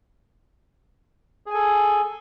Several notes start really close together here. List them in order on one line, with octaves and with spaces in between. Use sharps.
G#4 G#5 A4